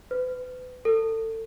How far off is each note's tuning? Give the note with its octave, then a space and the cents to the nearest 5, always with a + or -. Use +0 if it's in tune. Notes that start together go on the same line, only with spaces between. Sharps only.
B4 +35
A4 +30